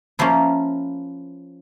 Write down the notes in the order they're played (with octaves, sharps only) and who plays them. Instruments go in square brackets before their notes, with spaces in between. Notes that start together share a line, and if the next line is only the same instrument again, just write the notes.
[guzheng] F3 A#3 C#4 E4